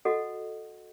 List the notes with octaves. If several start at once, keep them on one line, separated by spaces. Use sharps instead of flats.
F#4 A4 D#5 F#5